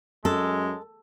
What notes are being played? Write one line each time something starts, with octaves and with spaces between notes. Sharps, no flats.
F#2 G#3 A4